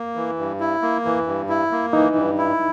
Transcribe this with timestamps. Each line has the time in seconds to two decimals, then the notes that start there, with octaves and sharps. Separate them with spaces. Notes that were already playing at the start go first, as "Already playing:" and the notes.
Already playing: A#3
0.15 E3
0.39 G2
0.60 E4
0.82 A#3
1.05 E3
1.27 G2
1.49 E4
1.72 A#3
1.93 E3 D#4
2.16 G2
2.38 E4